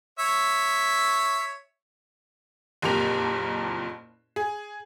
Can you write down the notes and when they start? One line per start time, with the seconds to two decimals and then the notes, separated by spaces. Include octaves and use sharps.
0.19 C#5 E5
2.82 F#1 F2 A#2 G4 A#4 F7
4.36 G#4